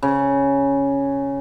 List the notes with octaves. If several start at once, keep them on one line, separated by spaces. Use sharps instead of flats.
C#3